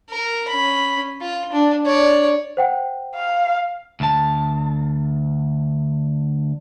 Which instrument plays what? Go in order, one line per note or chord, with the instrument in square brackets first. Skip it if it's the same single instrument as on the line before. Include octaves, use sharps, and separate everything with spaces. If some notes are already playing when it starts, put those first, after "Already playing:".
[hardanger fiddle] A#4
C#4 B5
F4
D4
C#5 D5
[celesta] C5 F#5 G5
[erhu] F5
[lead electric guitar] D2 A5